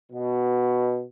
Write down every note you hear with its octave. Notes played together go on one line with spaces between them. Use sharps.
B2